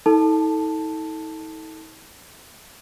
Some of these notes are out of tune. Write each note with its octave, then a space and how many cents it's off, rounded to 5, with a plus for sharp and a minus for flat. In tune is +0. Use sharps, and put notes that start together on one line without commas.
D#4 +45 A4 +0 A5 +0